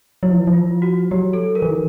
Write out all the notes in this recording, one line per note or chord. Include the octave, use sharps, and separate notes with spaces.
F#3 E4
F3
E3
F3
F4
F#4
F#3 G4
A4
A#4
E3
D#3